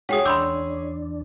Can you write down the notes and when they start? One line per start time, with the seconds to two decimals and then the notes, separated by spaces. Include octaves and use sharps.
0.09 G#3 C#4 F#4 G#4 F#5 G5 D#6
0.25 E2 D4 B5 C6 D6 E6 G6